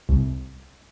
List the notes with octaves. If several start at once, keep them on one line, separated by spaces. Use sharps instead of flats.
C2